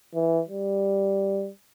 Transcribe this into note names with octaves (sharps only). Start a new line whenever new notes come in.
E3
G3